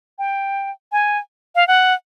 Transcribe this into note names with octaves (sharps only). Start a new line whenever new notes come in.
G5
G#5
F5
F#5